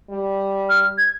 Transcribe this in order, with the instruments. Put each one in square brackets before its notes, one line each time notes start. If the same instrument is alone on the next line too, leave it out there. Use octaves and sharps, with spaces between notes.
[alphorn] G3
[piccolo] F6
G#6